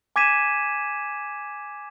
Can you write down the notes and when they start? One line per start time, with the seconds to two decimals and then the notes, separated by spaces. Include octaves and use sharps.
0.16 G#5 D6 G#6 B6 D#7 E7